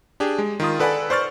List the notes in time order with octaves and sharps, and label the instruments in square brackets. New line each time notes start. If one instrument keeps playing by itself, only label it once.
[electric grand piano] D4 G4 G#4
G#3
D#3 F4 D#6
A4 B4 D5 F#5 G#5 B5
C5 D5 C#6 F6 A6